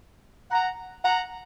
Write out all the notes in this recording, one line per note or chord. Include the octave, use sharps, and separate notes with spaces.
F#5 A#5
F#5 A#5